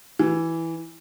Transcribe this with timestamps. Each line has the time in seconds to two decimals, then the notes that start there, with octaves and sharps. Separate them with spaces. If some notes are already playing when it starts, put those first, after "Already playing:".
0.19 E3